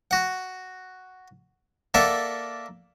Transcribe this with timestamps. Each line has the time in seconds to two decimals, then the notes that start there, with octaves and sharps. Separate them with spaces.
0.11 F#4 F#5
1.94 A#3 A4 D5 E5 F#5